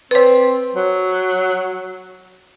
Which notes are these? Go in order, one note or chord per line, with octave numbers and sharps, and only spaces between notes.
C4 B4 C#5
F#3